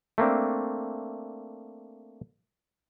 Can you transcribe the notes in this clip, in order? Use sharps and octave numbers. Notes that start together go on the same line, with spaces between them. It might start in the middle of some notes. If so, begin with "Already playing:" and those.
A3 A#3 C4 D4